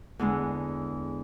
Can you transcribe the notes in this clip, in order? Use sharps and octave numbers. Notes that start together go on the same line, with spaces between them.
E2 D3 G#3